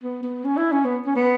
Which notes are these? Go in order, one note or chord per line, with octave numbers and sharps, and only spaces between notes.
B3
B3
C#4
E4
C#4
B3
C#4
B3